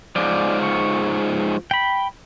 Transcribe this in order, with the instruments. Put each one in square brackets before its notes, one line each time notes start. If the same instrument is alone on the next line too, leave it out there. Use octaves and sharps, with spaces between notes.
[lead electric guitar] G#2 F3 [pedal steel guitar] D5
[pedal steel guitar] C#6
G5 B5